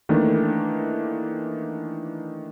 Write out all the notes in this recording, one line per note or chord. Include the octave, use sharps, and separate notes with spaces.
D#3 E3 A3 A#3 D4